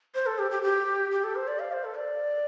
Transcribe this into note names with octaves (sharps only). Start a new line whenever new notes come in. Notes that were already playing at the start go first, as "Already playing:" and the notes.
C5
A4
G4
G4
G4
G4
A4
C5
D5
F5
C5
A4
D5